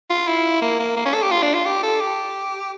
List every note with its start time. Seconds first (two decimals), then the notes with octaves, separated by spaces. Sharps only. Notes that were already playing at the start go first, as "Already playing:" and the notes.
0.10 F4
0.27 E4
0.62 A#3
0.79 A#3
0.97 A#3
1.05 C#4
1.14 A4
1.22 G4
1.31 F4
1.43 D4
1.54 F4
1.65 G4
1.83 A4
2.01 G4